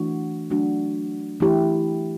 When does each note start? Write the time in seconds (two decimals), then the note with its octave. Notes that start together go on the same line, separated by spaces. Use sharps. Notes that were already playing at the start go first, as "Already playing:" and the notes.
Already playing: E3 A3 D4 F#4
0.51 F#3 A3 D4 F#4
1.40 E3 A3 E4 G4